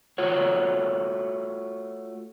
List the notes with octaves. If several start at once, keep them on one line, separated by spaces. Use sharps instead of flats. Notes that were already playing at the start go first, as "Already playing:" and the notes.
A3 F4 F#4 C#5